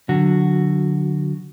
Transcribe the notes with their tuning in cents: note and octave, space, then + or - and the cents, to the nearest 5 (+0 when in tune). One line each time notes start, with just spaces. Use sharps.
D3 +0 F#3 -20 F#4 +0